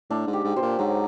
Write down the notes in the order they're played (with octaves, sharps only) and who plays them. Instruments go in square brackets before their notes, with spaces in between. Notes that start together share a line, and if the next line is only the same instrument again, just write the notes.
[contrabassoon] A2 [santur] D4
[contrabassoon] G#2
[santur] G4
[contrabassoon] G#2
[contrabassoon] B2 [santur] C5
[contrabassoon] A#2
[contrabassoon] G#2 [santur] F#3